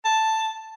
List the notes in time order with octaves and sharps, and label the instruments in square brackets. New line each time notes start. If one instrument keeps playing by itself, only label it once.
[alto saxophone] A5